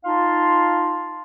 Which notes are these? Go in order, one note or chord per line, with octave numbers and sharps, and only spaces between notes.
D#4 F4 F5 A5 C6